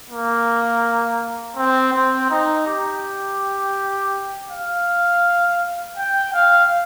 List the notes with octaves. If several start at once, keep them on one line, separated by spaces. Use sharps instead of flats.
A#3
C4
C4
D#4
G4
F5
G5
F5